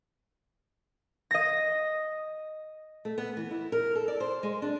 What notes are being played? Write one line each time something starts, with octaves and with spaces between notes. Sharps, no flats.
D#5 A#6
A3
B3
E3
E4
A#4
A4
D5
C5
G#3
D4